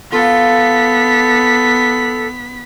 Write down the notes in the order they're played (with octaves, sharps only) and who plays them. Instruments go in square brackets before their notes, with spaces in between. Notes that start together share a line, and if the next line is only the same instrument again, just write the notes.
[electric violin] B3 B6 [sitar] F4 [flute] A4